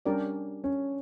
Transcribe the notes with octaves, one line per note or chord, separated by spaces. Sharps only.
G3 C#4 D4 G4 A#4 D5
C#4